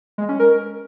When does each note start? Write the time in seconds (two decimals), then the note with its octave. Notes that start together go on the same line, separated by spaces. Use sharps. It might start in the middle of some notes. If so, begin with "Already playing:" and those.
0.18 G#3
0.29 C#4
0.39 A#4